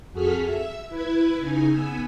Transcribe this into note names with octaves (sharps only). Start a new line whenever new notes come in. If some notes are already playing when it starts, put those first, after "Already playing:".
F2 F#4 G#4 A4 F6 B6
E5 E6
E4 B4 G#6
C#3 D#4 G#5
B3 G#5 E6